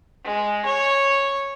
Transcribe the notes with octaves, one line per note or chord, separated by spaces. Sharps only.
G#3
C#5